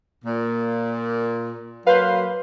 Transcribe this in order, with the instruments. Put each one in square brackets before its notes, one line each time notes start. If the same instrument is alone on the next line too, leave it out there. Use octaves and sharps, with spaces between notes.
[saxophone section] A#2
[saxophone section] F#3 A#3 C5 [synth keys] B4 F5